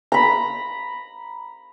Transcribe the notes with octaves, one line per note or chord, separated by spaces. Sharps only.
A#5 B5